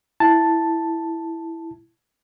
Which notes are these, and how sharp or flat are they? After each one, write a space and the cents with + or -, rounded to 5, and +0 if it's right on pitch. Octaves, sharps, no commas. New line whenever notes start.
E4 +0 A5 +0